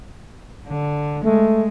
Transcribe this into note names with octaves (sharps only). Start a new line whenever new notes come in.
D3
G#3 A3